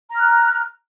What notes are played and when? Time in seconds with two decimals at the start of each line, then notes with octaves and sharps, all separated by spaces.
0.10 A#5
0.15 F6
0.19 F#6